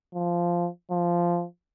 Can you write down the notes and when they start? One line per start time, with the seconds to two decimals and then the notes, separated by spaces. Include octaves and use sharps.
0.14 F3
0.91 F3